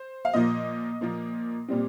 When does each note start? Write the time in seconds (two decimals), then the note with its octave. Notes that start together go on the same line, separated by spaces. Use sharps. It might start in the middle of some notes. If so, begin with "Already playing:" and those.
Already playing: C5
0.25 F5
0.33 A#2 F3 A#3 D#5
1.01 A#2 F3 A#3
1.68 A#2 G3 C4